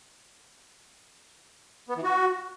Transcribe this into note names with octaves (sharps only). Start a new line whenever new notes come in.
B3
E3
F#4